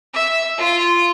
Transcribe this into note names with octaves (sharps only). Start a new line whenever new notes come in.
E5
F4